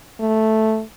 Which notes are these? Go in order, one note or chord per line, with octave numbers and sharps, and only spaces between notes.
A3